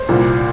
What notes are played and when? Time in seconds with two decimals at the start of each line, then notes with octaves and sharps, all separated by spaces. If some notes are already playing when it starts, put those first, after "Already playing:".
Already playing: C5
0.08 C2 A#2 F3